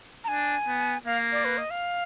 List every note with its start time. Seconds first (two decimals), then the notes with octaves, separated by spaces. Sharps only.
0.24 A#5
0.28 D4 G#5
0.67 B3
1.06 A#3 F5
1.32 D5
1.45 B4
1.58 D#5
1.70 F5